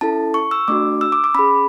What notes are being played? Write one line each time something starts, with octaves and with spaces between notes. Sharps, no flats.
C#4 E4 A4 A5
C#6
E6
A3 D4 F#4 D6
E6
D6
D6
C#4 G#4 B5